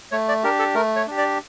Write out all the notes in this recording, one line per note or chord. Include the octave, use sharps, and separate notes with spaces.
A3 C#5
D5
D4 G4 A#4
A4
A3 A#4
C#5
D4 G4
D5